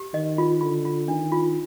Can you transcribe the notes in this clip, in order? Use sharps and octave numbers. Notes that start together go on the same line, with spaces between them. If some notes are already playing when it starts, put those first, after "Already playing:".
Already playing: G4
D#3 D#5
F4
D3 F4
F4
D#3 D4
F4